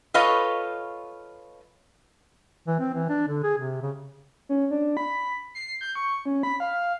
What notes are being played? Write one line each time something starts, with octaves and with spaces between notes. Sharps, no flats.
F4 A4 B4 C#5 D#5 F5
E3
C4
E3
D4
D3
G#4
C3
C#3
C#4
D4
B5
C7
G6
C#6
C#4
B5
F5